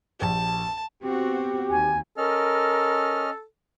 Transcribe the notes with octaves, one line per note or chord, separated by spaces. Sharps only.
A#1 G4 A5
B3 C4 F#4 G4
D#2 G#5
C#4 A4 A#4 D#5 F6